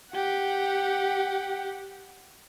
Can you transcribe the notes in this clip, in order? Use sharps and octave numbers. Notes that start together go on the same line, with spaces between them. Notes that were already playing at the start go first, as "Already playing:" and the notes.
G4 F#5